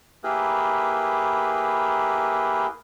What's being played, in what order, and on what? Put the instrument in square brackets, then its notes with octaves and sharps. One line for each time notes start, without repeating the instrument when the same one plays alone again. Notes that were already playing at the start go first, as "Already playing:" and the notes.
[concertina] A#3 E4 G4 G#4 A#4 B4